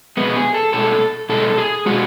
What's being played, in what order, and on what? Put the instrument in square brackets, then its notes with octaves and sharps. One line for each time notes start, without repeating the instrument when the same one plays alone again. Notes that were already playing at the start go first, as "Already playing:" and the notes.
[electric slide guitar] B2 G#3 B3
G#4
A4
B2 G#3 A4
B2 G#3 A4
G#4
B2 G#3 F#4